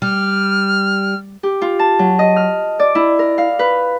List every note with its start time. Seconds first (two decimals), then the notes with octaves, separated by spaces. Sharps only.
0.02 G3 F6
1.43 G4
1.62 F4
1.79 A5
1.99 F#3
2.19 D#5
2.36 F6
2.79 D5
2.95 E4
3.19 A#4
3.38 F5
3.59 B4